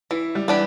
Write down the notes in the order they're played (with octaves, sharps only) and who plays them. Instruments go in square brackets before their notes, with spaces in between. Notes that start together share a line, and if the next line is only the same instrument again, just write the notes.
[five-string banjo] E3 [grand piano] E4
[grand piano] G3
[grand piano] E3 [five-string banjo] B3 D4 G4